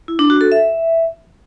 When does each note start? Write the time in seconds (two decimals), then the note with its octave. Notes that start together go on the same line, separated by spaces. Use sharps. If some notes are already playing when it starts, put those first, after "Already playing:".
0.08 E4
0.19 D4
0.30 F#4
0.41 A4
0.52 E5